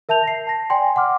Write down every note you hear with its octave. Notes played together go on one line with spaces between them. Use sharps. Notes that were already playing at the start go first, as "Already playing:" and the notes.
A#4 E5 A5 G6 F7
A#6 C7
A5 A#6
D5 G5 G#5 C6
F#5 C6 D6 F6